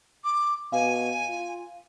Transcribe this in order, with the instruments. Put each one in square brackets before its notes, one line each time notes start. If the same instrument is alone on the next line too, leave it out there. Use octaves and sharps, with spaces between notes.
[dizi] D6
[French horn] B2 [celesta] F5 [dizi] G#5
[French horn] F4